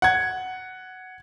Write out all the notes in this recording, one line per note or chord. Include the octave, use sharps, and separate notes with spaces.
F#5 G#6